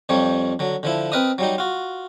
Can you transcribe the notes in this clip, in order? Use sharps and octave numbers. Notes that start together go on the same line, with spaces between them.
F2 F3 G3 C#5
D3 F#3
D3 F3 E4
C4 A#4 B4 D#5 D#6
F#3 G3 D#4
F4 F#4